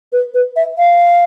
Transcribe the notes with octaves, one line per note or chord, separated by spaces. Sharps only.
B4
B4
E5
F5